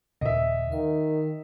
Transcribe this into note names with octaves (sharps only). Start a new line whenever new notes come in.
D#2 A#2 C#3 D#5 E5
D#3 F5